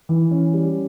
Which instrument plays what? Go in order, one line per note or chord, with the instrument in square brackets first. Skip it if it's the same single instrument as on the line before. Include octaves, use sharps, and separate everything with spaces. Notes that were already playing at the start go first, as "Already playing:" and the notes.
[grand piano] E3
C#4
G3